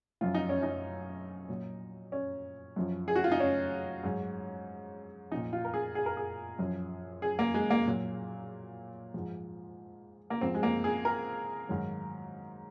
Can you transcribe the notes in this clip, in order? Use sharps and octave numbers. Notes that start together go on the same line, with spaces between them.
F#2 F3 F4
D#4
C#4
D#4
A#2 F#3
C#4
F#2 F3
G#4
F#4
F4
D#4
C#4
G#2 F#3
A#2 F3 D#4
F4
A#4
G#4
G#4
A#4
G#4
F#2 F3
G#4
A#3
G#3
A#3
A#2 F#3
G#2 F3
A#3
G#2 F3 C4
G#3
A#3
G#4
A#4
G#2 D#3 F#3